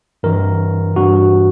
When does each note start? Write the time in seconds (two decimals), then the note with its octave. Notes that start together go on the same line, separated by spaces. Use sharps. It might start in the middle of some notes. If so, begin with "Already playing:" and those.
0.23 G2 E3 A#4
0.96 G2 E3 F#4